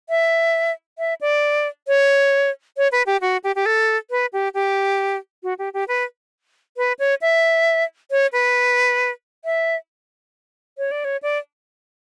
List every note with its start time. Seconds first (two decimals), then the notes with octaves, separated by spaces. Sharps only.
0.09 E5
0.98 E5
1.21 D5
1.88 C#5
2.77 C#5
2.92 B4
3.06 G4
3.21 F#4
3.44 G4
3.56 G4
3.66 A4
4.11 B4
4.33 G4
4.54 G4
5.43 F#4
5.59 G4
5.74 G4
5.88 B4
6.77 B4
6.99 C#5
7.22 E5
8.11 C#5
8.33 B4
9.45 E5
10.78 C#5
10.91 D5
11.05 C#5
11.23 D5